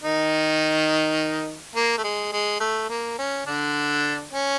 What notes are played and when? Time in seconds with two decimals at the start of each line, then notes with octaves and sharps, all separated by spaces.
0.03 D#3 D#4
1.75 A#3
1.98 A3
2.04 G#3
2.32 G#3
2.60 A3
2.90 A#3
3.18 C#4
3.46 D3 D4
4.33 C#4